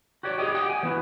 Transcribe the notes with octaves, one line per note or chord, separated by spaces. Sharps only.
F#4 G4 C#5 D5
G4 G#4 C#5 D#5 G5
G4 F#5 G5
G#5
E3 B3 E4 F#4 B4